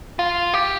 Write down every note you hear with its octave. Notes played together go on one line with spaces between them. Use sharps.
F4
G4